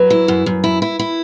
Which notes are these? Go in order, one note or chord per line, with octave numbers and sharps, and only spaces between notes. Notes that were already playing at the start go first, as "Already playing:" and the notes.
Already playing: F#3 B4
E4
F#2
F#2
E4
E4
E4